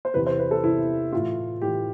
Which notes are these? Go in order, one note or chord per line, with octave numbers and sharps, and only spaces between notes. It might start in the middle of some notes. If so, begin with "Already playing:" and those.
C5
E2 C3 E3 B4
C5
B4
A4
E2 C3 E3 E4
A2 E3 F4
A2 E3 G4